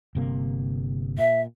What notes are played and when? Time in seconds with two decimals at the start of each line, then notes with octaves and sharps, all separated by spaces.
0.15 G1 C3 A#3
1.19 A#2 E5